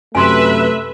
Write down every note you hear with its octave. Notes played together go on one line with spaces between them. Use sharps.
F#2 C3 A3 B4 E5 G#5 C6